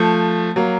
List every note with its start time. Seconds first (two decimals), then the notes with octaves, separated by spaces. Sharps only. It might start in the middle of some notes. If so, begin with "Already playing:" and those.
Already playing: F3 A3
0.56 F#3 A#3